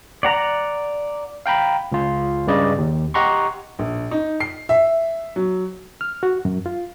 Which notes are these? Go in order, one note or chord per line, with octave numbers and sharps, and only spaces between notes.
D5 F#5 A#5
F5 G5 A#5 B5
C#2 F4
G2 C#3 D5 D#5
D#2
G4 D#5 F#5 A#5 C6 C#6
A#1
D#4
C7
E5
F#3
F6
F#4
F#2
F4